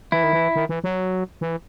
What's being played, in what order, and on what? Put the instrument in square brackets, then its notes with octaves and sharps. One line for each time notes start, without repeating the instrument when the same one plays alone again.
[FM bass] E3 [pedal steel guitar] E4
[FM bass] D#3
E3
D#3
E3
F#3
E3